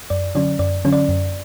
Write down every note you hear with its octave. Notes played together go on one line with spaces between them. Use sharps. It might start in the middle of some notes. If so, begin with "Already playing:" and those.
F#2 D5
D3 F#3 C#4 D5
F#2 D5
D3 F#3 C#4
D5
F#2